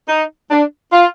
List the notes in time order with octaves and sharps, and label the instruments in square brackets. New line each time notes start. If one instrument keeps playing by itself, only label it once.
[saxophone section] D#4
D4
F4